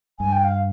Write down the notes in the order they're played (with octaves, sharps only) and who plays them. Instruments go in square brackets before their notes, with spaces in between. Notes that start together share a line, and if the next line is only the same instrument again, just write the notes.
[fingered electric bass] G2 [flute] G#5
[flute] G5
F5